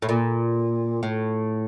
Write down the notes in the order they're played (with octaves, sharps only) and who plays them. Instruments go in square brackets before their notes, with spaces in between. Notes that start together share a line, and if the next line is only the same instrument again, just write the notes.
[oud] A2
A#2
A2